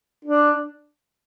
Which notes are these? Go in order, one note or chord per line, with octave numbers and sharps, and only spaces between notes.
D4